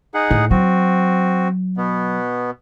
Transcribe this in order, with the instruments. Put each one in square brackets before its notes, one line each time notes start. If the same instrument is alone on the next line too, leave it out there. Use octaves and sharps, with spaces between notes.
[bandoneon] D#4 G#4 F#5
[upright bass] A2
[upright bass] F#3 [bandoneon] C4 F#4
[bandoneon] B2 B3